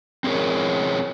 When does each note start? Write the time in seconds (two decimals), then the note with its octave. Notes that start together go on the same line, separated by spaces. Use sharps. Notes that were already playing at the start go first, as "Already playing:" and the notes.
0.24 C4 C#4 G#4 A#4 C#5